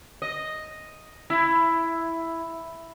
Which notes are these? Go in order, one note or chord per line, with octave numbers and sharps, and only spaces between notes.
D#5
E4